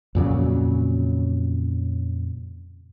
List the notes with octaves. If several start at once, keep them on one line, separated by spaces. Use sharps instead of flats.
F2 A#2 C#3 F#3